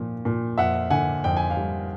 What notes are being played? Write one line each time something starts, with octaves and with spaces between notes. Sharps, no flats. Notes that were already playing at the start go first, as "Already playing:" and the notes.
Already playing: A#2 F3
A#2
F2 E5 F#5
D3 F#5 G#5
F2 G5
G#5
F5 G5
G3